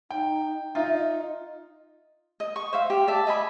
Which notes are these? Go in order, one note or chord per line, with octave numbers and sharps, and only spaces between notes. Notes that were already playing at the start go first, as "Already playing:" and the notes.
D#4 G5
D#4 F4 E5
D#5
D#5
C#6
C5 E5 F5
G4
D5 E5 A5
D#5 G#5 B5